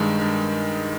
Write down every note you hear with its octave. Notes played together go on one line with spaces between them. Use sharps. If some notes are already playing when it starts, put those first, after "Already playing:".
Already playing: G2 D#3 G#3
G2